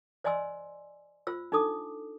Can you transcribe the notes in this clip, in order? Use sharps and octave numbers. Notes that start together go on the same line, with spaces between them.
C5 D5 D#5 G#5 C6 E6
F4 C5 E6
D4 D#4 A4 D6 D#6